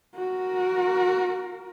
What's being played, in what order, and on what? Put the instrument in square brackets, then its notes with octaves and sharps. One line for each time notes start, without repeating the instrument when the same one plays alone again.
[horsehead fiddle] F#4 A#4